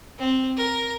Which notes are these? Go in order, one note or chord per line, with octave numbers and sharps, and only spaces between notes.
C4
A#4